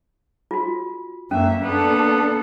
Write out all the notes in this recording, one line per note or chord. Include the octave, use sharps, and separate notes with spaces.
F4 F#4
F#2 A#3 C#4 E5
B3 D4 A4